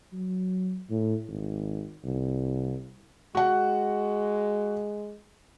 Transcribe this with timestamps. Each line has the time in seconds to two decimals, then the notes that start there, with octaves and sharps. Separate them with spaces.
0.13 F#3
0.90 A2
1.28 G#1
2.04 C2
3.35 G#3 F#4 F#5